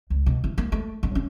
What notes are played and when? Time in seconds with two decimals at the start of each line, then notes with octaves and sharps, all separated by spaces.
0.10 C#2
0.26 B2
0.44 E3
0.58 A#3
0.72 A3
1.03 G2
1.15 C#4